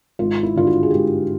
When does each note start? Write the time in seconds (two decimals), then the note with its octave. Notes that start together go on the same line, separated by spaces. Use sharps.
0.19 G#1 F4
0.43 E4
0.56 G2 D3 F4
0.67 F#4
0.83 G#4
0.91 G#1 G4